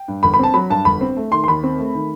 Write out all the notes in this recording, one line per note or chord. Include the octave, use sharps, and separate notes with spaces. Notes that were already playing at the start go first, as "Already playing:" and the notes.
Already playing: G5
G2
G1 B5
B5
C4 A5
F#3 B5
G2 A5
G1 B5
C4
A3
D#3 C6
C6
D#2 B5
C4
A3
D#3